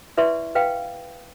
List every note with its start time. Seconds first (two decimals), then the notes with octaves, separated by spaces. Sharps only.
0.17 E4 B4 D5 E5 C6 C#6
0.55 B4 F5 G5